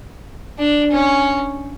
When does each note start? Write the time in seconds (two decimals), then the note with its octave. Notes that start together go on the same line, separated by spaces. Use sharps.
0.59 D4
0.91 C#4